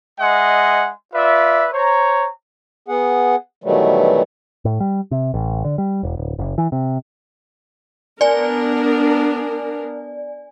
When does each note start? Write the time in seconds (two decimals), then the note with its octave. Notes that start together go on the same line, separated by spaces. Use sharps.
0.20 G#3 D#5 E5 F#5 G#5 C6
1.14 F4 B4 D5 E5
1.73 C5 C#5 A#5
2.88 B3 G#4 F#5
3.64 B2 D#3 E3 F#3 G3 A3
4.65 A2
4.80 G3
5.11 C3
5.34 A1
5.64 D3
5.78 G3
6.03 E1
6.17 D1
6.39 F#1
6.58 E3
6.72 C3
8.21 B3 D4 A#4 D5 G#5